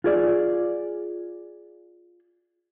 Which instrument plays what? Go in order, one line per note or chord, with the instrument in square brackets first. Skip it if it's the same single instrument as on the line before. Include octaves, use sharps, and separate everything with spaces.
[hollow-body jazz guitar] F4 G#4 D5